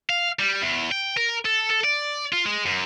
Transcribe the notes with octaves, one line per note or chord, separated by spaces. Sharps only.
F5
G3
E2
G5
A#4
A4
A4
D5
F4
G#3
F#2